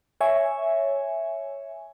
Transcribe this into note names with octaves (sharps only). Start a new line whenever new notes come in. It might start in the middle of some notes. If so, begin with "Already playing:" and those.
C#5 E5 G#5